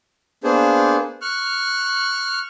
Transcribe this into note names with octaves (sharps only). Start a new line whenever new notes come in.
A#3 B3 D4 G#4 C5
C#6 F6 F#6